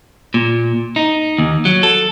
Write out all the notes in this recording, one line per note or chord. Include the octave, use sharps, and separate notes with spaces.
A#2
D#4
D#2
F#3
A4